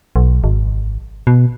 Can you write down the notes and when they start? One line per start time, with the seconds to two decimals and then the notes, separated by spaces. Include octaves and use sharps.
0.16 B1
0.44 G#1
1.27 B2